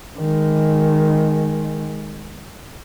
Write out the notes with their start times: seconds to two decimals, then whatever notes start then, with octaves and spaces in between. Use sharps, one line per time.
0.18 D#3 G#3